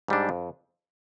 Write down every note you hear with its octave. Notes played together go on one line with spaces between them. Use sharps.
G#2 G3 D4
F2